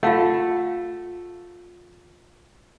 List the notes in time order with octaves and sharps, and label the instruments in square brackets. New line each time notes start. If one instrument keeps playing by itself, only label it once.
[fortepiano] A3 A4 [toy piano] F4 F5 F#5